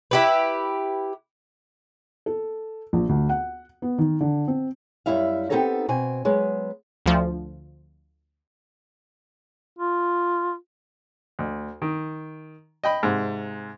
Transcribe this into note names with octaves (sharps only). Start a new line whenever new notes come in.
E4 G4 B4
A4
A#1
D2
F#5
B3
D#3
D3
C4
F#2 F#3 G3 E4 E5 F5
B3 C4 D#4 G4 A4 C#5
B2 C4 G#5
F#3 G#3 B3
D2 F3
F4
D2
D#3
D#5 G5 B5
G#2 C3